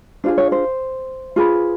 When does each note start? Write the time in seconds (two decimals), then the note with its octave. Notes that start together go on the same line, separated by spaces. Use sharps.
0.24 D4 F4 G#4 C5
0.38 C#5
0.52 C5
1.36 F4 G#4 B4